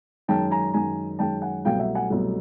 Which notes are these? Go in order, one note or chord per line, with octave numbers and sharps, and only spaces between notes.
F#2 D#3 G#3 G5 A5
G#5 A#5
F#2 D#3 G#3 G#5 A#5
F#2 D#3 G#3 G5 A5
F#5 G#5
C2 B2 F#3 A3 F5 G5
E5 F#5
F#5 G#5
C2 B2 F#3 A3